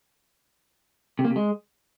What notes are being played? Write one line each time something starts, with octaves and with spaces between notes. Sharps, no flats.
C3
A#3
C3
G#3